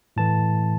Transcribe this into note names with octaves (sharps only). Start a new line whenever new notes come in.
A2 E3 A3 A5